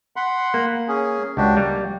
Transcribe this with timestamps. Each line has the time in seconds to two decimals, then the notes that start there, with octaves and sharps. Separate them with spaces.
0.16 F#5 B5 C6
0.54 A#3
0.88 C#4 G#4
1.37 C#2 D4 F#4 G4
1.57 G3 A#3